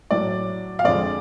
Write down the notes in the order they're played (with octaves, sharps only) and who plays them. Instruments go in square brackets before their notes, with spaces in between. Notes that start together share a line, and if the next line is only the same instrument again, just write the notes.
[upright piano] A2 F#3 A3 D5
F5
F2 D3 F3 G#3 D5